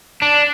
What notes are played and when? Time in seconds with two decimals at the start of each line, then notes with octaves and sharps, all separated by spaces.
0.22 D4